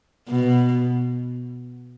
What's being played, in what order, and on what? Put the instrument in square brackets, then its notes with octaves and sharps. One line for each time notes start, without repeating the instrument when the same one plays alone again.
[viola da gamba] B2